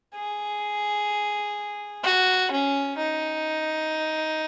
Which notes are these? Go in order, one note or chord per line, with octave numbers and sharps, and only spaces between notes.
G#4
F#4
C#4
D#4